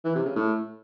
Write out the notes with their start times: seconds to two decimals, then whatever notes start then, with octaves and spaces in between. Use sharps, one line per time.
0.05 E3
0.15 C3
0.26 C#3
0.36 A2